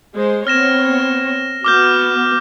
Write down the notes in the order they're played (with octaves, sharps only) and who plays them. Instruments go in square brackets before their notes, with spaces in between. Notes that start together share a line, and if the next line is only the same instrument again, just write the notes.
[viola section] G#3 C5
[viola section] B3 C4 C#5 [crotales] F6 A#6 E7
[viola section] B3 F#4 [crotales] D6 F6 G6